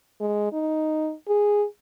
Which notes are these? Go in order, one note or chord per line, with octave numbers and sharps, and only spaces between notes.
G#3
D#4
G#4